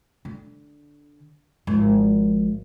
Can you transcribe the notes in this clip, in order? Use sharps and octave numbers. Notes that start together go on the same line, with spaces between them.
D3
G#1 F3